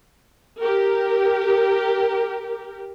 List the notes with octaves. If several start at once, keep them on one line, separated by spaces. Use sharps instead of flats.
G4 A#4